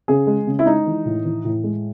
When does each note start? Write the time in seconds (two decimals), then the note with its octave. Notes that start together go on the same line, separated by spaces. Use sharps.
0.08 C#3 G#4
0.27 G#3
0.47 C#3
0.59 E4
0.66 G#3 D#4
0.87 E3
1.06 A2
1.25 E3
1.45 A2
1.64 G#3